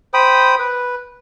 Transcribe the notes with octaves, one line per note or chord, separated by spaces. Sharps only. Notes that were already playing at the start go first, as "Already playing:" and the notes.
C5 G5 B5 D#6
B4